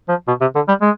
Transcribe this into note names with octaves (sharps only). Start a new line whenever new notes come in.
F3
B2
C3
D3
G3
G#3